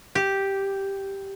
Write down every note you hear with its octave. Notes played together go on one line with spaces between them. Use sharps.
G4